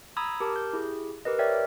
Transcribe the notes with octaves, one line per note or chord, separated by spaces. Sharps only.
A#5 B5 D#6 E6 G#6
G4 A#4 A5 D6
G6
E4 G4 G#4
G4 A#4 B4 D#5
A#4 C#5 D5 E5 G5